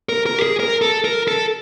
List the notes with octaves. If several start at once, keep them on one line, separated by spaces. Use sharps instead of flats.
A#4
A#4
G4
G#4
A#4
A4
A#4
A4